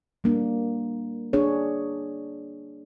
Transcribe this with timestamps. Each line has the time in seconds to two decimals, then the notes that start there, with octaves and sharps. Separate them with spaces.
0.24 G3 A#3 D4
1.33 D4 G#4 C#5